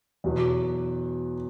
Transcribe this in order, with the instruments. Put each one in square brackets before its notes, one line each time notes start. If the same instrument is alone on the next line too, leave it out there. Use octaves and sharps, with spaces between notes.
[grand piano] E2 B2 F#3